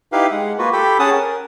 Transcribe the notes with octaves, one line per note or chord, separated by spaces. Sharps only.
D#4 E4 G4 B4 F5
G#3 F#5
A#3 F4 F#4 B4
G4 A4 G5 B5
C#4 G#4 F#5 A5 D#6
A#4